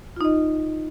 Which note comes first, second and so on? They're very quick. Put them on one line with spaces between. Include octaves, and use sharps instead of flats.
F4 D#4 D#5